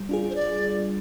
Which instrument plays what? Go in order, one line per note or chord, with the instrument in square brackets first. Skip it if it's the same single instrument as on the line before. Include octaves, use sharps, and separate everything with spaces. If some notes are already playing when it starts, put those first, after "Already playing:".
Already playing: [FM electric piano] G3
D4 F4 G#4
[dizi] C5
D5